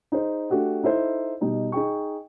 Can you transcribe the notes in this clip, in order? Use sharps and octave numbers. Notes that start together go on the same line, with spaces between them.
D#4 G#4 C5
A3 D4 F#4 G4
D#4 E4 A4 C5
B2 G3 D#4
D#4 G#4 G5 C#6